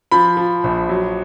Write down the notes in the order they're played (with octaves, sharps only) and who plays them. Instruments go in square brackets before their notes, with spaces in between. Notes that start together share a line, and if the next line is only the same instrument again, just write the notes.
[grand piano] F3 B5
F3
A#1
F#3